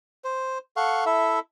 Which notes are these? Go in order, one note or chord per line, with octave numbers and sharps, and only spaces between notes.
C5
A4 F5 F#5 C#6
E4 A4 E5